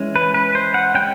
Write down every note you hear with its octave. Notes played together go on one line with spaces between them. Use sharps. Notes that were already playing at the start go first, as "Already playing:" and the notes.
Already playing: E3 G#3 C#4
B4
B4
C5
F#5
G#3 C#4 G5